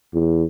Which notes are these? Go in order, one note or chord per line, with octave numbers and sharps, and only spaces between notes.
E2